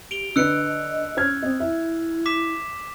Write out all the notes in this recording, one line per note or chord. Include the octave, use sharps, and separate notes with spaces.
G4 D7 F7 G7
D3 B4 D#5 E6 F#6 C#7 D7
C#4 C#5 F6 G#6
C4 D#5
E4 E5
D6 B6 E7